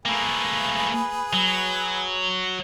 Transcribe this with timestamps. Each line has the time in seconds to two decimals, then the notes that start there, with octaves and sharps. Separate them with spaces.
0.05 A3 A#3 G#4 B4
1.34 F#3